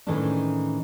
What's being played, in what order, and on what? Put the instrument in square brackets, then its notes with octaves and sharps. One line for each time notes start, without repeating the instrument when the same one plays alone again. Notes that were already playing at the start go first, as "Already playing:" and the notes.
[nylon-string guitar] A2 D#3 E3 G#3 C#4 D4